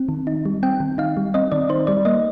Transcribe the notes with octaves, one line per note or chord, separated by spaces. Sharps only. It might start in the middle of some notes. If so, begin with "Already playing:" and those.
Already playing: C4
D#3
D#4
G3
C4 G5
D#3
D#4 F5
G3
C4 D#5
D#3 D5
D#4 C5
G3 D5
A#3 D#5